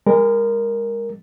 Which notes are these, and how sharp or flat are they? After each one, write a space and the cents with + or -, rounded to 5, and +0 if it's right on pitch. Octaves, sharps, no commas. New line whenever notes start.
G#3 -35 A#4 +0